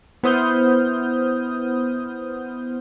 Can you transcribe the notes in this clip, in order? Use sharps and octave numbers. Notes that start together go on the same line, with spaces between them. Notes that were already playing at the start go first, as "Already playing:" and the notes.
B3 E4 C5 D#6 F6 G6